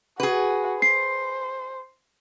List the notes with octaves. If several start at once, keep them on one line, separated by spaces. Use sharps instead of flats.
F#4 G#4 B4
C5 C7